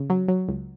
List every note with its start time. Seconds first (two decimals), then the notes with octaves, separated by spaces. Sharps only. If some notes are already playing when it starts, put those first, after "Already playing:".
Already playing: C#3
0.10 F#3
0.28 F#3
0.48 C#2